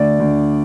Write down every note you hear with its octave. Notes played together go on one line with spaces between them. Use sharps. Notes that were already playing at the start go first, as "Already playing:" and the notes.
Already playing: D2 D5
D2